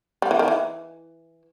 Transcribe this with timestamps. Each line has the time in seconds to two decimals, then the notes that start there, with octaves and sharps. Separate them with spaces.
0.22 G3
0.31 E3
0.39 D#3
0.48 E3